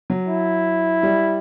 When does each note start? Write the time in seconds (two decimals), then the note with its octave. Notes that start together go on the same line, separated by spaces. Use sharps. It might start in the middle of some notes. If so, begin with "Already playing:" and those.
0.10 F#3
0.28 E4
1.03 G3